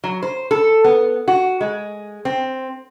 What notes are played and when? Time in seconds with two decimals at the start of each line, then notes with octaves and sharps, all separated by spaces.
0.04 F#3
0.23 C5
0.51 A4
0.84 B3
1.28 F#4
1.61 G#3
2.25 C4